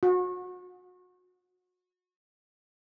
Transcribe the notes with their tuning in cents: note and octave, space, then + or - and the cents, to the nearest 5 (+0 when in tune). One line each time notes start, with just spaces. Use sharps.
F#4 -30